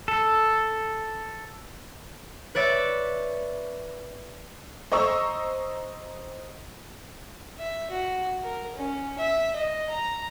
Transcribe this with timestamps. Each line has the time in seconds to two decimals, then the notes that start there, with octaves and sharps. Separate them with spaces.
0.08 A4
2.55 B4 C#5 D5 E5
4.92 C5 D#5 A#5 C#6 E6
7.58 E5
7.90 F#4
8.43 A#4
8.75 C#4
9.19 E5
9.56 D#5
9.90 A#5